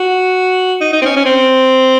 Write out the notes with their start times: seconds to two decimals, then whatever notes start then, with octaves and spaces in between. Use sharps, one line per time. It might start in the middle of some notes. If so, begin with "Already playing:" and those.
Already playing: F#4
0.81 D#4
0.93 D#4
1.02 C4
1.06 C#4
1.17 C#4
1.25 C4